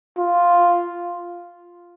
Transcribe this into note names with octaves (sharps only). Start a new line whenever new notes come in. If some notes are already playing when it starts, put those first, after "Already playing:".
F4